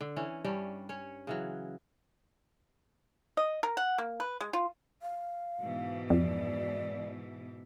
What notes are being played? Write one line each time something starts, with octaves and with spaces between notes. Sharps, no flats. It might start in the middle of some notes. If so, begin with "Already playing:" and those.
D3
E3 C#4
G2 G3 C#4 D4
C#4 C#5
C#3 E3 F#3
D#5
A#4
F#5
A#3
B4
G#3
F4
F5
G#2 B2 E3
F2 D5